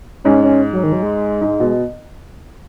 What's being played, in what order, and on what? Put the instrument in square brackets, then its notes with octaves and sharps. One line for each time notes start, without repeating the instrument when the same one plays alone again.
[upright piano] G#2 [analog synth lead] C#4
[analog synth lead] C#4
F#3
D#3
F#3
G#3
[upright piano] G#2
B2